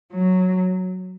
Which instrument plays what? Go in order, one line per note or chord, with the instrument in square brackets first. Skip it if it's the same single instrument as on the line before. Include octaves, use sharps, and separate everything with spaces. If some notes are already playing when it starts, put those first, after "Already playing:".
[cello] F#3